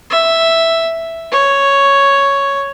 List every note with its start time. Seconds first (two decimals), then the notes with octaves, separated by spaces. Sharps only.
0.10 E5
1.32 C#5